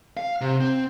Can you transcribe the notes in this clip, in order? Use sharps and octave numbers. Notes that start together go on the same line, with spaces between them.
F5
C3
C4